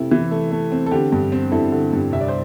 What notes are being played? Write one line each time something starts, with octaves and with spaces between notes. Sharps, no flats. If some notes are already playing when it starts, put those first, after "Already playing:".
Already playing: C3 A3 E4
E3
A3
A3
C4
A4
D3 G4
G2
C4
G2 E4 A4
D3
G2
C2 E5
D5
C5